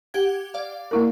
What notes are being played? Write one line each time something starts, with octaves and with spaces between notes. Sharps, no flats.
G4 F#5 G#6
D5 F5
A#3 E4 A#4